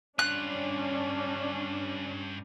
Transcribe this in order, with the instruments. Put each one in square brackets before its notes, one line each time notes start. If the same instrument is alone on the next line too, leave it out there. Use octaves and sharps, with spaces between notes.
[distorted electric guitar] G2 F4 [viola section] C#4 D4 [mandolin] F#6